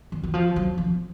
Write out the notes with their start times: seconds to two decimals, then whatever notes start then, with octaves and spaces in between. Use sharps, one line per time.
0.12 E3
0.24 E3
0.34 F3
0.56 F#3
0.78 F3